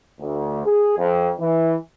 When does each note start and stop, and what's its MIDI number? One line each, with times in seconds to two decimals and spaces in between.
0.21 0.63 38
0.66 0.98 68
0.98 1.30 41
1.39 1.75 52